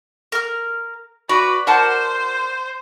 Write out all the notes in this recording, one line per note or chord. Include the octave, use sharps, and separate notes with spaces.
A#4 F6
F#4 B4 D5
A#4 C5 F#5 A5